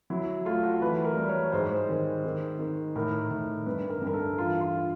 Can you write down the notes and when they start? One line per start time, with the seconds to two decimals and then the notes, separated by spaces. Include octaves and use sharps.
0.10 F#3 E4
0.45 A3 F4
0.63 F#4
0.81 E3 B4
1.05 A#4
1.17 G3
1.29 C#5
1.52 G#2 C5
1.89 D#3
2.24 D#3
2.59 D#3
2.96 A2 A#4
3.31 A2
3.66 G2 B4
3.90 A#4
4.01 G2
4.07 A#4
4.14 A4
4.37 E3 F4
4.61 F4